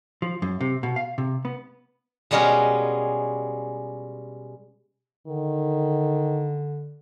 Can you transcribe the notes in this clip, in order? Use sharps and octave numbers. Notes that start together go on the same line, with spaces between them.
F3
F#2
C3
B2
F5
C3
B3
B2 G3 G#3 B3 C#4 A#4
D3 D#3